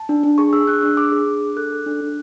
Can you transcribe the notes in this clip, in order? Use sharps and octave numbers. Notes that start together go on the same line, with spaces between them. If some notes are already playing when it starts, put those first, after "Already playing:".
Already playing: A5
D4
D4
G#4 C#6
G#4 E6
D4 F#6
D4 E6
G#4 D6
G#4
D4
D4
A4 F#6
A4
D4
D4